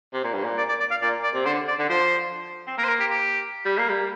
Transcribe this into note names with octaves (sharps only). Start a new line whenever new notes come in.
C3
A#2
G2
A#2
D5
D5
D5
F5
A#2 D5
D5
C3
D3 C5
D5
D3
F3 C5
C4
A#3 A#4
C5
A#4
G4
G4
G3
A#3
G3